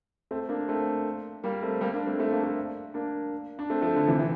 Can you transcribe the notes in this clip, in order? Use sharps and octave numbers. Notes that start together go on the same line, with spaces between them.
A3 C4
A#3 D4
A3 C4
G3 A#3
A3 C4
G3 A#3
A#3 D4
A3 C4
A3 C4
A#3 D4
A3 C4
A#3 D4
D4
A3 C4
F3 A3
D3 F3
C3 E3
E3